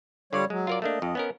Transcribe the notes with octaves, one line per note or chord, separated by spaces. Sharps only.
D3 G3 F4 C#5 D5
F#3 G#3
F4 A#4 D5
A3 A#3 D4 D#5
F2
B3 C#4 A#4